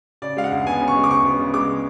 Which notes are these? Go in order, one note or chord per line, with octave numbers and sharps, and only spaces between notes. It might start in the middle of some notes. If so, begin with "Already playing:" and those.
C#3 D5
G#3 F5
F#5
D2
B3 G#5
C#3
C#6
G#3
D6
D2 C#6
B3
C#3
G#3 D6